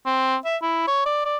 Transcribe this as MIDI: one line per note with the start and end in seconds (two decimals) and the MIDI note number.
0.06 0.36 60
0.45 0.57 76
0.62 0.86 64
0.87 1.04 73
1.06 1.21 74
1.25 1.37 74